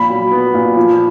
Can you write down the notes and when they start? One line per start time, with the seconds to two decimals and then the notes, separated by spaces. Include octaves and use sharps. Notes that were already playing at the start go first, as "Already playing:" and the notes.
Already playing: A#2 F3 B5
0.09 F#3
0.32 B3
0.54 A#2
0.76 F3